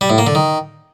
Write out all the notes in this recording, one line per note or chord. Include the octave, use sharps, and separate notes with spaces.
G3
A2
A#3
D3
D#3